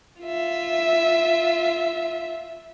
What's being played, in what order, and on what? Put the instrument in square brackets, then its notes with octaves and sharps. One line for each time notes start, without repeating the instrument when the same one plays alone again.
[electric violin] F4 E5